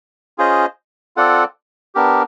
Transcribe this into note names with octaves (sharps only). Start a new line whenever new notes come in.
C#4 F4 G#4 C5 D#5
C4 F4 A4 D5 F#5
B3 D4 G4 A#4